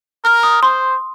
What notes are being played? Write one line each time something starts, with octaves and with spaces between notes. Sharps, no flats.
A#4 F6
D#6
C5 C6